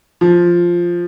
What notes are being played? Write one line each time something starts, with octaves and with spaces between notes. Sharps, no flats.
F3